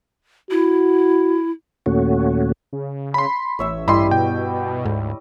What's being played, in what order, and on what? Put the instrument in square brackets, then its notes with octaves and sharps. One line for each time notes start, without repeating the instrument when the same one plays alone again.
[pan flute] E4 [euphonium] F#4
[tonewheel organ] D#2 A#2 A3 C#4 F#4
[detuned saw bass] C#3
[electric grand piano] B5 C6
[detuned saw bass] A1 [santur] C#5 E5 E6
[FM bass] G2 [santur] G3 E4 D#5 [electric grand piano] B5 C6
[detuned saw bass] B2 [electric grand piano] G5
[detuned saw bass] D2 [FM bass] G#2